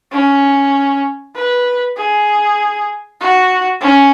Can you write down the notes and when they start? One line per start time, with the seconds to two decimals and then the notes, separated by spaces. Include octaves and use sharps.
0.12 C#4
1.35 B4
1.97 G#4
3.21 F#4
3.81 C#4